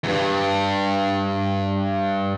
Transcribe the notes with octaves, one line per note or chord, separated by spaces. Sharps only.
E2 G2